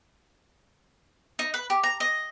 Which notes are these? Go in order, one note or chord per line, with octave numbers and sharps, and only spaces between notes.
D#4
B4
G4
A#5
D#5